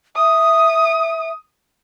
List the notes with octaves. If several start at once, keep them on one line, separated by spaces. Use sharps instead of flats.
E5 D#6